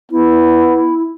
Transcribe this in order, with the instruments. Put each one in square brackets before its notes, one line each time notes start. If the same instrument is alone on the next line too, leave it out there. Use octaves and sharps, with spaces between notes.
[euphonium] B3 [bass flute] E4